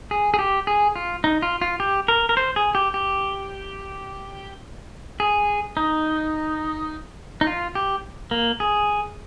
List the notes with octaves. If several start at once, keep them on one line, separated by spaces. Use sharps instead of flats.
G#4
G#4
G4
G#4
F4
D#4
F4
F4
G4
A#4
A#4
C5
G#4
G4
G4
G#4
D#4
D#4
F4
G4
A#3
G#4